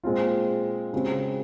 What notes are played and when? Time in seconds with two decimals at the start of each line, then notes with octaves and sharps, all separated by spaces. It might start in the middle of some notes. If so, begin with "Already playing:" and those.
0.04 A#2 G#3 C4 F4
0.93 C#3 G#3 C4 F#4